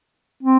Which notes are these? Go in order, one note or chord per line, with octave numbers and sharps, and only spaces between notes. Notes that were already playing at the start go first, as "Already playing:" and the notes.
C4